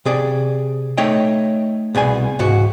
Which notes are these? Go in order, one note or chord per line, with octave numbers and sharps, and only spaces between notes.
C3 G#4 D5
A3 D#4 C#5 D#5 G5
C2 B2 G#4 G#5
C#2 G#2 F#4